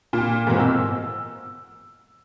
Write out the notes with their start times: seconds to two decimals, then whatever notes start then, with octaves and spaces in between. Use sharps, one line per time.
0.13 A#2
0.47 G#2 B2 E3 A#3 C4
0.59 E6